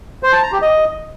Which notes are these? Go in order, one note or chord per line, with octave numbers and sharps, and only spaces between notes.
C5
A5
A#5
G4
D#5